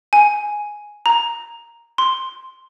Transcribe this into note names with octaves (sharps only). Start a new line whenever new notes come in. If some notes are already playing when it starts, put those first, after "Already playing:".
G#5
A#5
C6